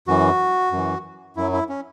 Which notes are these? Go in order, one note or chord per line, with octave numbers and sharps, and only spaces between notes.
F#2 E3 F#4
F#2 E3
F#2 F#3 E4
E4
C#4